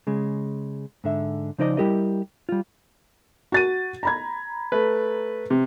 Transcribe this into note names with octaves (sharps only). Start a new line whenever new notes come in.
C#3 G#3
G#2 D3 E5
C#3 F3 D#4 C5 D5 D#5
G3 E4 G4 A#4 D#5
G3 F4
F#4 A6 D#7
A#5 B5 G#6
A3 B4
C3